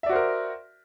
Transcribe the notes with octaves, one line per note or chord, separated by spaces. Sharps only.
F#4 A#4 C5 D5 E5